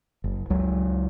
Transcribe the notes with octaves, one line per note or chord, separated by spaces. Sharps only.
F#1
C#2 F#3